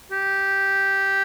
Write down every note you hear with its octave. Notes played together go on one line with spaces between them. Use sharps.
G4